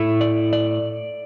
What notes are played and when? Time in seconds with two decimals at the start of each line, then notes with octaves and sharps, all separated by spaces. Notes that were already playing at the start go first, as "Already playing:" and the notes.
Already playing: A2 A3 E4
0.21 D5
0.53 D5